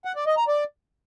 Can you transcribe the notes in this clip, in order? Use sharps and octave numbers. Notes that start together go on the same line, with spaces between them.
F#5
D5
D#5
A#5
D5